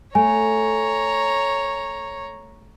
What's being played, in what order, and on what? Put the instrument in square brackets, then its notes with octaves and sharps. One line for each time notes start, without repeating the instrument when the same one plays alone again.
[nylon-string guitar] A3 [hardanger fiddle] C#5 A#5 [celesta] G#5